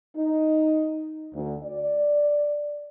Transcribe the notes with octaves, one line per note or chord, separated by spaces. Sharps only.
D#4
D2
D5